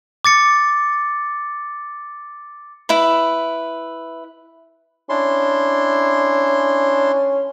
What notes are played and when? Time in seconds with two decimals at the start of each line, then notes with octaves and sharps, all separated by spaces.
0.25 D6 A6 C#7
2.89 E4 B4
5.09 C#4 D4 E4 C6